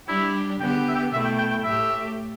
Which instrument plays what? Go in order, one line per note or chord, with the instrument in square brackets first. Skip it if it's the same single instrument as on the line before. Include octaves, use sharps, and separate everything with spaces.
[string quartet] G3 D4 G4 [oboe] E4
[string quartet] D3 B3 G4 [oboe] G5
[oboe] E5
G5
[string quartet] B2 A3 E4 [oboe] E5
[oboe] G5
G5
G5
[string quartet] A2 A3 G4 [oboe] E5